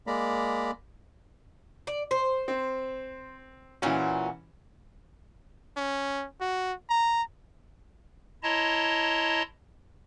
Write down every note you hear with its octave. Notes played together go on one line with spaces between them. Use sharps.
G#3 A#3 D5 A#5 B5
D5
C5
C4
A#2 E3 C#4 F#4
C#4
F#4
A#5
E4 C#5 D#5 A5 A#5 C6